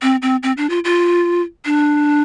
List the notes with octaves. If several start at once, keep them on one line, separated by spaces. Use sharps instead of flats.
C4
C4
C4
D4
F4
F4
D4